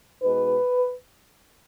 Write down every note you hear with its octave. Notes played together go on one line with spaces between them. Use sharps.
B2 G#3 D#4 B4